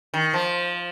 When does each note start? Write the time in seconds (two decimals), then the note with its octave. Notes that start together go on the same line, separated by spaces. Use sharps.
0.14 D#3
0.34 F3